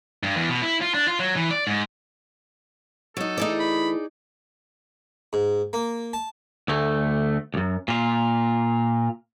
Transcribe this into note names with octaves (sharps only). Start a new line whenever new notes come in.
G2
E2
B2
E4
F4
D4
F4
F#3
E3
D5
G#2
F#3 D#4 A4
E3 A3 D#4 G#4 D5
B5
G#2
A#3
A5
D2 A3
C#2 F#2
A#2 F4